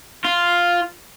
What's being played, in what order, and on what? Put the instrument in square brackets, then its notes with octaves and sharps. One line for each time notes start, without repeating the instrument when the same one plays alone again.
[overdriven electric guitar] F4